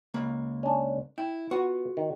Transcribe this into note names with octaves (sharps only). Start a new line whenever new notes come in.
C#2 A#3 B5
C#4 D4
E4 G5
B3 F4 F#4
D#3